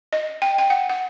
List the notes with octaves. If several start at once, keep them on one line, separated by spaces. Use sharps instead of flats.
D#5
G5
G5
F#5
F#5